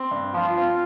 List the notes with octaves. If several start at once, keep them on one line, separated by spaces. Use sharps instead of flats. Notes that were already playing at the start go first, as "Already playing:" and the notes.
Already playing: C4
G2
F3 F4
C4